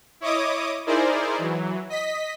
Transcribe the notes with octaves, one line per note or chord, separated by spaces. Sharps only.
E4 C#5 D#5 D6 D#6
D#4 E4 G#4 A#4 C5 D5
E3 F#3
D#5 B6